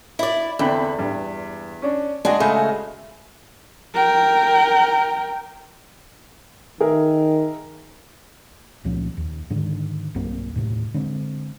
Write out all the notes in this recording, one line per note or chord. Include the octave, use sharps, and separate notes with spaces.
E4 D5
E2 D3 C4 B5
G2
C#4 D4
G#3 D4 F#4 G#4 D#5
C#3 A3 G#4
A#4 G5
D#3 G#4 A#4 E5
C#2 A#2 F3 C#4
D#2
G#2 D3 D#3 D4
B1 G2 A#3 C4
D#2 A2 C3
D3 G#3 C4